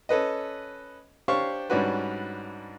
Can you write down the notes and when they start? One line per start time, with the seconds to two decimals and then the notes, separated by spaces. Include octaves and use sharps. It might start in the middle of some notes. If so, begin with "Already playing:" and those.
0.09 C#4 A4 B4 D#5
1.28 D4 G4 C5 C#5 F5 C#6
1.70 G#2 G3 C#4 D4 F#4 B4